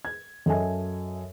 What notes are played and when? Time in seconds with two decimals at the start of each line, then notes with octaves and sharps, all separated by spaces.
0.05 G#6
0.46 F#2 A4 D#5 E5 G#5